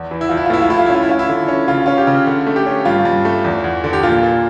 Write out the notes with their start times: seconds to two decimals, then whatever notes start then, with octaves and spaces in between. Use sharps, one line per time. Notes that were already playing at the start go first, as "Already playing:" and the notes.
Already playing: E2
0.11 E3
0.21 E4
0.29 E2 F4
0.37 E4
0.46 F4
0.50 A2 E4
0.62 F4
0.70 A3 E4
0.78 F4
0.86 E4
0.90 C#4 F4
1.03 E4
1.09 C#4 F4
1.19 E4
1.29 D3
1.48 C#4
1.68 C#3 F4
1.86 C#4 F4
1.98 G4
2.07 C#3
2.27 D3
2.47 A3
2.56 G4
2.66 C#4
2.85 G2 F4
3.05 G2
3.25 A3
3.44 E2
3.64 E2
3.84 D3
3.93 G4
4.03 A#2 F4
4.23 A#2